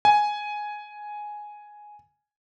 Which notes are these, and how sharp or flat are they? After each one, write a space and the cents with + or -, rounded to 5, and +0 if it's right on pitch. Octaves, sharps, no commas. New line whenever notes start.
G#5 +5